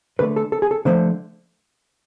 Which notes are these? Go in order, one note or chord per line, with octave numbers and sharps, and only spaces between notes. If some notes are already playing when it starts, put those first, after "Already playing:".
D3 A3 B4
A4
A4
G#4
A4
D3 F3 A3 C5